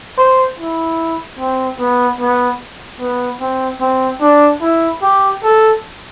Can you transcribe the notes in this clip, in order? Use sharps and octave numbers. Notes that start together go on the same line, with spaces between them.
C5
E4
C4
B3
B3
B3
C4
C4
D4
E4
G4
A4